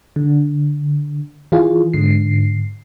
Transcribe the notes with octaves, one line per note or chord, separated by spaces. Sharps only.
D3
E3 F4 G#4
G#2 D3 C7